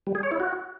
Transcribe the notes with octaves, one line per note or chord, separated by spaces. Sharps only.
G3
G#4
C#5
E4
F#4